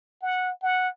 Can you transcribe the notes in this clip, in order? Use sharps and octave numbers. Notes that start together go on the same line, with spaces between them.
F#5
F#5